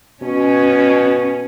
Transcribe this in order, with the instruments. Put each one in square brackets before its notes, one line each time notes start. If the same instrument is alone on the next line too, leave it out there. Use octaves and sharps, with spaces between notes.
[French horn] B2 [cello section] C#4